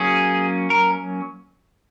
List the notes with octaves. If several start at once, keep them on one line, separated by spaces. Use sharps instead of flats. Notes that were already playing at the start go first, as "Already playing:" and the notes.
Already playing: F#3 A#3 C#4 G#4
A#4